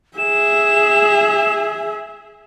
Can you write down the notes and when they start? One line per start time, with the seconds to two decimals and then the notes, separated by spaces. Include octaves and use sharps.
0.17 G#4 E5 E7